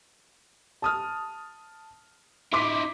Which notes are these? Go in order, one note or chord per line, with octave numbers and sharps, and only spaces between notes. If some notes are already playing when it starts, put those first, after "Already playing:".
A5 D#6 F6
D#4 E4 C6 D6 B6